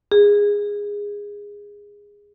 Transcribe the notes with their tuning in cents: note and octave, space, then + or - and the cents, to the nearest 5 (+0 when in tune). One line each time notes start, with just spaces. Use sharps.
G#4 -15